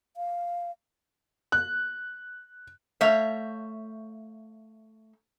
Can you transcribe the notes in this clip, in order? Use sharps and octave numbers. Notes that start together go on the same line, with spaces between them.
F5
F#6
A3 C#5 E5 F5